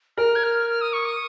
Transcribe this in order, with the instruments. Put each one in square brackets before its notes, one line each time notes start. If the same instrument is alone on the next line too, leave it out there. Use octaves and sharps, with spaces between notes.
[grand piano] A#4 [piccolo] F6
[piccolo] G#6
F6
F6
D#6
C#6
D#6